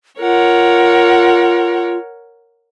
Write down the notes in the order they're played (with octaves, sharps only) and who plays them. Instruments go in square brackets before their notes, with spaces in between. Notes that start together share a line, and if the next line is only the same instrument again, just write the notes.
[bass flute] F4 [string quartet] A#4 C#5 F#5